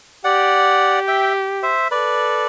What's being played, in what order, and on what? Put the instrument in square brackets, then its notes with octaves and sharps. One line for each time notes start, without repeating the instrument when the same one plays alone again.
[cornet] G4 [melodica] D5 F#5
[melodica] E5 G5
C5 E5
[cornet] A4 [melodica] B4 D5